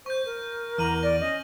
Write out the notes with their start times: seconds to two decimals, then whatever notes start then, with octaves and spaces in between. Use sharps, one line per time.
0.06 C5 C#6 G6
0.26 A#4
0.78 E2 A#5 F6 D#7 F#7
1.03 D5 A#6
1.21 C#4 D#5